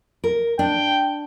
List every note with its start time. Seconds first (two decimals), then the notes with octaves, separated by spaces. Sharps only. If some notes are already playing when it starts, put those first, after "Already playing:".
0.24 A#4
0.59 D4 G5